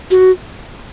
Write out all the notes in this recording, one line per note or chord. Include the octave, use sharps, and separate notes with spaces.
F#4